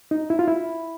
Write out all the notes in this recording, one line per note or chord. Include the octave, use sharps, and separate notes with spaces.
D#4
E4
F4
E4